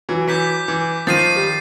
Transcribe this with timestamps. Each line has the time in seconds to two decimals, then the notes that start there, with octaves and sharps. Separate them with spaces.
0.09 E3 F#3
0.27 E3 F#3 D6 G6 B6
0.68 E3
1.07 D#3 F3 A6 C7 D#7
1.36 G3